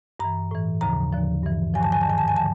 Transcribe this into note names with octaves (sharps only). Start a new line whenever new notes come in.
G2 E3 A#5
A2 E3
D#2 C#3 F3 A#5
D#2 D3 F3
G2 E3
G2 D3 F3 G#5
A5
G#5
A5
G#2 D#3 G#5
A5
G#5
D3 F3 A5